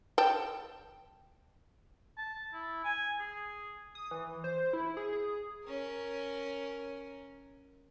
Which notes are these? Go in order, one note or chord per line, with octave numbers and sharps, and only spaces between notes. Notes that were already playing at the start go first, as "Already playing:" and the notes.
G5 A5
A5
E4
G#5
G#4
D#6
E3
C5
E4
G#4
G#4
C#4 A#4